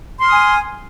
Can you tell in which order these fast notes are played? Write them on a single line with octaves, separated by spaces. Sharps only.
C6 F6 D#6 G#5